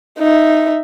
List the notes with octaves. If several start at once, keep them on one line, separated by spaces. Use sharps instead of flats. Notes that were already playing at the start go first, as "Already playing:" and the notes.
D#4 E5